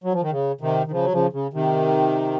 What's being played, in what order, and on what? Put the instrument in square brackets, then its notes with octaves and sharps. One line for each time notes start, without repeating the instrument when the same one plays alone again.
[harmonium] F#3
F3
D#3
C#3
C3 D#3
D#3
C#3 F3
F#3
C#3 F3
C#3
C3 D#3